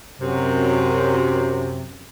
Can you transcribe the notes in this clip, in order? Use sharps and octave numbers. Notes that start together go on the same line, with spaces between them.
F#2 C3